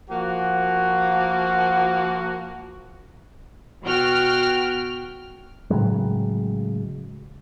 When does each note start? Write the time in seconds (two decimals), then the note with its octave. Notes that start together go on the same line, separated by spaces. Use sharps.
0.10 F3 A#3 F#4
3.83 B2 F#4 G5 F6
5.70 A2 C#3 F#3 G#3